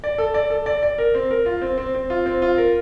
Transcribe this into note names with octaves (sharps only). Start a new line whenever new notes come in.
D5
A4
D5
A4
D5
D5
A#4
C4
A#4
F4
C4
C4
C4
F4
C4
F4
A#4